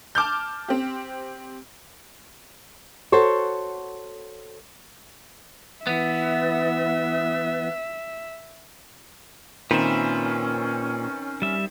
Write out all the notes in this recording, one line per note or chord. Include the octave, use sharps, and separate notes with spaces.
A5 D6 F6 G6
C4 G4
F#4 A4 C5 C#5
E3 B3 E5
A#2 D#3 C4 C#4 B4 E5 E7
G3 E5